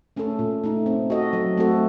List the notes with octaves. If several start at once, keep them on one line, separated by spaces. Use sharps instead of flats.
A3 C#4 A4
A#2
A3 D#4
C4
F#4 A4 D#5
F#3
A3 C4 F#4 A4